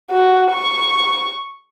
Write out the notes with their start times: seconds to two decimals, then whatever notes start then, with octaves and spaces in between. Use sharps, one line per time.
0.11 F#4
0.51 C#6